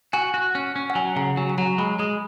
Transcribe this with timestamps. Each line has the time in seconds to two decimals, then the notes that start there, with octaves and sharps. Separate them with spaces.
0.13 F#4 G#5
0.34 F#4
0.55 C#4
0.76 C#4
0.90 F#5
0.95 F#3 G#5
1.16 C#3 F#5 A#5
1.37 F#3 G#5
1.50 G#5
1.58 F#3 F#5 A#5
1.78 G#3 G#5 B5
1.99 G#3 B5 D#6